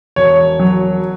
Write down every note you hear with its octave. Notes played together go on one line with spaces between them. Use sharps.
E1 C#5
F#3